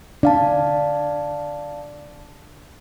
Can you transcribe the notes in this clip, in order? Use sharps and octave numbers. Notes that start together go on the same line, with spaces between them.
D4 D5 F5 A5